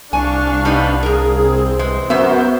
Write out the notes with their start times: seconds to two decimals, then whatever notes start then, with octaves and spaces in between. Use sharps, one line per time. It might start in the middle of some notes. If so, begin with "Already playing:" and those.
0.13 C2 D4 F5 G#5 C#6
0.65 G3 B3 D#4
1.03 G#4 A#4 A#5
1.37 C4
1.79 E3 G#3
2.10 F#2 B3 F#4 A#4 C5 E5